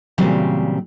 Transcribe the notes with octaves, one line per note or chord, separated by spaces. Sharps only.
A#2 C#3 E3 F#3 G3 C4